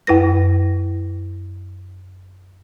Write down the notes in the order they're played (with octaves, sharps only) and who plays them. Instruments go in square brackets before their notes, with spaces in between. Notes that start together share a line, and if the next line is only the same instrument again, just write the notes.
[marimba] F#2 E4 B4 A#6